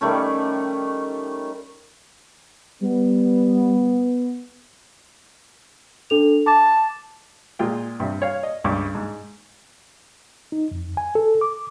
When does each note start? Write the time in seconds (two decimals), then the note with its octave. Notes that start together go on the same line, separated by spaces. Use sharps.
0.01 D#3 G3 A3 C#4
2.82 G3 B3
6.10 D4 A4 F7
6.47 A5 D6
7.59 A#2 G#3 F4 G5
8.00 G2 C3
8.22 C#5 F5
8.43 D#5
8.64 C#2 G2 C#6 D6
8.95 G#2
10.52 D#4
10.71 F2
10.97 G#5
11.15 A4
11.41 D6